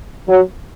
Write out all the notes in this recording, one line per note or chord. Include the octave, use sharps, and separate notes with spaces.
F#3